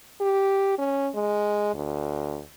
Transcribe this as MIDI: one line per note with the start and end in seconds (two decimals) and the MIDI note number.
0.21 0.78 67
0.78 1.09 61
1.15 1.73 56
1.74 2.41 38